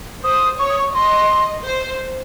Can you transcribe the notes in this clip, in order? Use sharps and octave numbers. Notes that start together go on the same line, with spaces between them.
C5 D#6
C#5 C#6
D#6
C#6
D#5 C6
C5